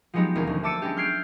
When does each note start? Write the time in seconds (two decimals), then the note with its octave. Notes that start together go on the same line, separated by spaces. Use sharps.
0.14 F3 F#3 G#3 B3 D#4 G4
0.35 E1 D#2 A#3 C#4
0.47 D2
0.63 E5 A5 D6 E6 C#7 D#7
0.82 G#3 B3 C#4 D4 G4
0.97 F6 G6 G#6 C7 D7